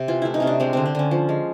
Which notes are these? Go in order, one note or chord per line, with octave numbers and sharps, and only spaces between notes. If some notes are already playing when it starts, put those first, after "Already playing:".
Already playing: C3
E3 F4
A3 E4
D#4
C3 C#4
D4
G#3 C4
D3 C4
C4
D3 C#4
F3
G#3